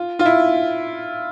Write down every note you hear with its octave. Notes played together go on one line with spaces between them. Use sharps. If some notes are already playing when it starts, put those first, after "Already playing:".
Already playing: F4
F4
E4